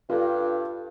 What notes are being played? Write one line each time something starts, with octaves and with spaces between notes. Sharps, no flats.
G2 F4 A4